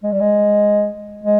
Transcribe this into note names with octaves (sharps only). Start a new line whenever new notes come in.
G#3
G3
G#3
G#3